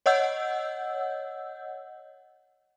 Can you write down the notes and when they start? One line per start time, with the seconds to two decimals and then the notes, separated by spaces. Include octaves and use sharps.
0.06 C#5 D#5 F#5 E6 G6